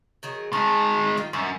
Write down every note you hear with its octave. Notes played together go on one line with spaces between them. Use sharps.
D#3 F#3 G#4
D#3 G#3 A5
D#4 F4 G5
F#2 D#3